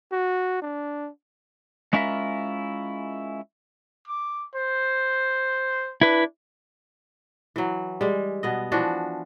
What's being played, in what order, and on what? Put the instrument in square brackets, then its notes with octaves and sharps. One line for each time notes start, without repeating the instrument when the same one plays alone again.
[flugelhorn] F#4
D4
[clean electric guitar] G#3 C#4 E4 F4 A#4 E5
[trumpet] D6
C5
[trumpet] D4 [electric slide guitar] E4 B4
[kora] E3 F#3
G3 G#3
B2 B3 D#5
E3 F3 D4 F#4